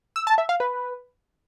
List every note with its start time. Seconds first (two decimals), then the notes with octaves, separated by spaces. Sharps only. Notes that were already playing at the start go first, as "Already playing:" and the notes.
0.16 E6
0.27 A5
0.38 E5
0.49 F5
0.60 B4